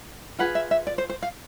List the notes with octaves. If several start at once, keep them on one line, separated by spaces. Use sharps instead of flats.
F4 G#4 B4 F#5
E5
E5
D5
C5
C5
F5